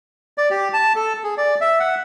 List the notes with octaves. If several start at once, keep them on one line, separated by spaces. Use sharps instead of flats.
D5
G4
A5
A4
G#4
D5
E5
F#5